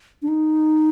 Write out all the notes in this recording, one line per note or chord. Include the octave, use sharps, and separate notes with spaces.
D4
D#4